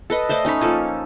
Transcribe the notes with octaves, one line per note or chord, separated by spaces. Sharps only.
A4 B4 D#5
A3 C5 D5 D#5
C#4 D#4 C#5 B5
F3 A#3 A4 G#5